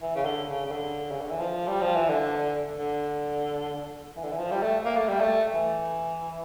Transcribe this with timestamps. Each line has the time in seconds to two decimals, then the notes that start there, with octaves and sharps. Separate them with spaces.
0.02 E3
0.15 C#3
0.25 D3
0.48 C#3
0.66 C#3
0.71 D3
1.11 C#3
1.21 D3
1.31 E3
1.41 F3
1.68 G3
1.81 F3
1.95 E3
2.09 D3
2.78 D3
4.16 E3
4.23 D3
4.31 E3
4.39 F3
4.51 G3
4.62 A3
4.85 A#3
4.97 A3
5.08 G3
5.21 A3
5.54 E3